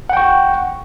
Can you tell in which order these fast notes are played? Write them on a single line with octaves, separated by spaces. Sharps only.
F#5 G5 C#6